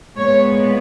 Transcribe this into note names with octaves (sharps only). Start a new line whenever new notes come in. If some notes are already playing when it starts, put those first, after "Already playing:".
A#2 G#3 B3 C#5